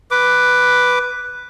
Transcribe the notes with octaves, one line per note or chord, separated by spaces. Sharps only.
B4 D6